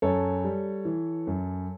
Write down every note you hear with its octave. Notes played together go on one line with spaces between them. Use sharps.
F#2 A4 C#5
G3
E3
F#2